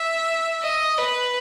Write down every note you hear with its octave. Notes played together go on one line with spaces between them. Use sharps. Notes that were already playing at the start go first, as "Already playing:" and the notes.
Already playing: E5
D#5
B4